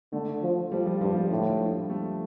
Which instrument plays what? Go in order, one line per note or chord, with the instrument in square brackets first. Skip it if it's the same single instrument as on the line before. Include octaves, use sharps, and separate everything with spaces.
[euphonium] D3 [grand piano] A3
[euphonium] F3
[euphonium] F3 [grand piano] G3
[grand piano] F3
[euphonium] G2 [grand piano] F3
[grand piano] G3
[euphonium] A2 [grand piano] D3
[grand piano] F3
G3
A3